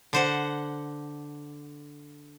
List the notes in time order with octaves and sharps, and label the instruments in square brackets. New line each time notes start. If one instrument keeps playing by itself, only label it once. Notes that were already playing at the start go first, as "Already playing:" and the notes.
[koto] D3 C5 F#5